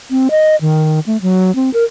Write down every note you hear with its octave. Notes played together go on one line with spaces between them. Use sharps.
C4
D#5
D#3
A3
F#3
C4
A#4